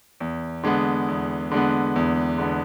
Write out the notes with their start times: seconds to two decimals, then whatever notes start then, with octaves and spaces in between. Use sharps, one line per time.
0.20 E2
0.63 D3 G#3 B3
1.08 E2
1.51 D3 G#3 B3
1.96 E2
2.38 D3 G#3 B3